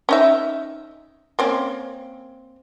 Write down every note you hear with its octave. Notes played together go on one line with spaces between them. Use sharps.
C#4 D#4 E5
A#3 C4 C#4